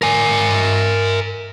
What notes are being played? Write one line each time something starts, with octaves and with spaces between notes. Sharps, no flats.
A#4 G#5